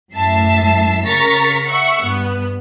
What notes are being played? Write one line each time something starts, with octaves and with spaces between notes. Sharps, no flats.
F#2 A2 E5 A5 C7
C#3 A#4 A#5 C#6 A6 B6
E5 F#5 C#6
G2 B3